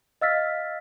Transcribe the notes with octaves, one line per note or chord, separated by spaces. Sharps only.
D#5 F5 E6 F6 A6 B6